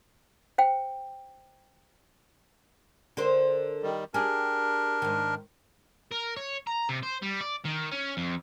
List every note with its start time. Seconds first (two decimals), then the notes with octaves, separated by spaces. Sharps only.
0.58 C5 G5
3.17 D3 A#4 C5
3.83 D#3 G3
4.14 D4 G4 G#4 A#4
5.02 G#2 D#3
6.12 A#4
6.37 C#5
6.67 A#5
6.89 C3
7.03 C5
7.22 G3
7.41 D5
7.65 D#3
7.92 C#4
8.17 F2